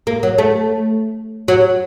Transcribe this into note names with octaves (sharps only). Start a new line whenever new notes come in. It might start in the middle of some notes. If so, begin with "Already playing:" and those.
A#3
F#3
A3
F#3